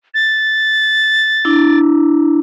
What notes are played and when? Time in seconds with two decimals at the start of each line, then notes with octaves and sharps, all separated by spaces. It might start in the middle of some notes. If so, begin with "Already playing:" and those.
0.14 A6
1.45 D4 E4